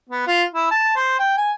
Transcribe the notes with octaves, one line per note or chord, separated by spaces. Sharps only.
B3
F4
E4
A5
C5
G5
G#5